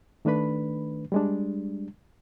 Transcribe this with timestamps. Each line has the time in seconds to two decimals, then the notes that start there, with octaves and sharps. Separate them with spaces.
0.25 D#3 A3 D4 B4 B5
1.12 G3 G#3 D4